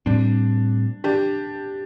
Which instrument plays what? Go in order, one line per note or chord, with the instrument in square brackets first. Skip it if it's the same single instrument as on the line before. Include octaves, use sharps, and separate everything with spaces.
[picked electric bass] A2 G3 C4 [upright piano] D4
[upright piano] D4 G4